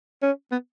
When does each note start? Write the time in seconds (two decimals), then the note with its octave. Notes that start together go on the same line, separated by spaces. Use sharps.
0.22 C#4
0.52 B3